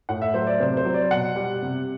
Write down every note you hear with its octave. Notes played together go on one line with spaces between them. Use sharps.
A2 F#5
E5
F#3 C5
D5
C3 C5
C5
F#3
D5
B2 F#5
G3
C3